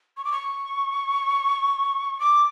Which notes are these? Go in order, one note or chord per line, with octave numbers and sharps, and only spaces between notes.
C#6
D6
C#6
D6